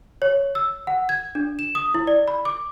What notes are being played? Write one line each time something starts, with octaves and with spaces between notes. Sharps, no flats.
C#5
E6
F#5
G#6
D4
E7
D#6
E4
D5
B5
D6